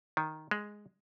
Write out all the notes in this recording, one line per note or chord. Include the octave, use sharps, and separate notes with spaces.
D#3
G#3